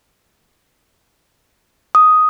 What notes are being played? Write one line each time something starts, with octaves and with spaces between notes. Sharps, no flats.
D#6